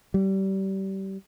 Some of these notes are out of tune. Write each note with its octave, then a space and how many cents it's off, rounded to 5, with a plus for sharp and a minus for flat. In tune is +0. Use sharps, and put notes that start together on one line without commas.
G3 -25